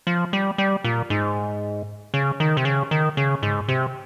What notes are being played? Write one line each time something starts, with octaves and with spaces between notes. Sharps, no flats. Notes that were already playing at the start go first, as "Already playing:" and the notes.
F3
G3
G3
A#2
G#2
C#3
D#3
C3
C#3
D#3
C#3
G#2
C3